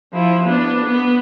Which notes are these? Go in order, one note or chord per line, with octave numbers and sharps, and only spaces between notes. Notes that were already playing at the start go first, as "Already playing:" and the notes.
F3 E4
B3 D4
B3